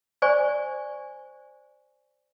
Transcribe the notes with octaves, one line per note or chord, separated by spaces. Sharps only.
C5 D5 G#5 C#6